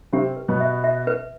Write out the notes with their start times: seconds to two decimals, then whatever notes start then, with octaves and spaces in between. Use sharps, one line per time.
0.12 C3 C4 G4
0.36 B4
0.48 B2 B3
0.60 E5
0.84 E5
1.07 B4